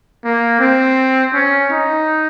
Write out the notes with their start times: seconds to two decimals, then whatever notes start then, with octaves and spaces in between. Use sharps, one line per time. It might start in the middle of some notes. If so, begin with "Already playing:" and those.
0.24 A#3
0.59 C4
1.33 C#4
1.70 D#4